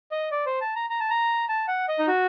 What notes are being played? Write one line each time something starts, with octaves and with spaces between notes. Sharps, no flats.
D#5
D5
C5
A5
A#5
A#5
A5
A#5
A5
F#5
D#5
D#4
F#4